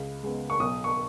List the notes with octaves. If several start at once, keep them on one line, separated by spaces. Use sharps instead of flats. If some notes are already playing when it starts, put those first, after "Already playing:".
Already playing: C#2
C#3 G#3 B3
C#6
B1 D#6
C#6